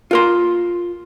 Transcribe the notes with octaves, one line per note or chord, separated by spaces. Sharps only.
F4 A#4 C6